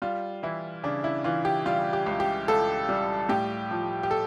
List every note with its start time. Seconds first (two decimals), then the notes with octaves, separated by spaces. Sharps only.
0.02 G3 F4
0.43 E3 E4
0.83 C#3 D4
1.04 E4
1.24 E3 F4
1.45 G4
1.66 G3 F4
1.93 G4
2.06 C#2
2.20 G4
2.48 C#2 A4
2.89 G3
3.29 A2 G4
3.71 F3
4.03 G4
4.11 A4